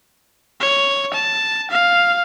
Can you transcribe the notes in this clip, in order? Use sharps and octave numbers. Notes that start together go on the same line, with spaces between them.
C#5
A5
F5